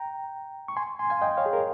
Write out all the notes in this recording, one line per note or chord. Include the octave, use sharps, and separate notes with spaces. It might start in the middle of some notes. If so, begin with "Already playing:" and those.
Already playing: G5 A#5
C#6
G#5 C6
G#5 C6
F5 G#5
D#5 G5
C#5 F5
G#4
A#4